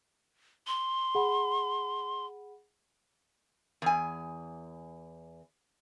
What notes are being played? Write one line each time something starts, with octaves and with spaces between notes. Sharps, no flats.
C6
G#4 F#5 B5
E2 G#5